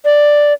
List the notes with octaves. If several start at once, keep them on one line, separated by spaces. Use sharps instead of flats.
D5